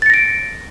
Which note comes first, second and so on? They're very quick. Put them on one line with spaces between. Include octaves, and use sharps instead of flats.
A6 C#7 A#6 D7